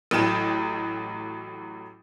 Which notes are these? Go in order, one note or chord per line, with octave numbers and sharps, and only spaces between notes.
A1 A2 F#3 G5 E7